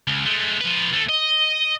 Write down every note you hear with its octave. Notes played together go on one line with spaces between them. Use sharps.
C#2
G#3 A3
F3 B4
D2 A3
D#5